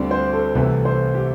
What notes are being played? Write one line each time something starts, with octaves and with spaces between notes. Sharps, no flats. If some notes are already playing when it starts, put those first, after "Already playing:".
Already playing: D2 D3 G3 C4 D5
C5
A4
C2 C3 E3 A3 A4
C5
G4